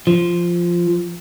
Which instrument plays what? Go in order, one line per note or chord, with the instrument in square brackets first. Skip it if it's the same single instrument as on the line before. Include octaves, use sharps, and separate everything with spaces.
[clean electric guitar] F3